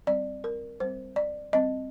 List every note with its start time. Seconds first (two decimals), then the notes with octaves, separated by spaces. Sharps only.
0.07 G3 C4 D5
0.44 A#4
0.80 G3 C4 C5
1.16 D5
1.52 G3 C4 D#5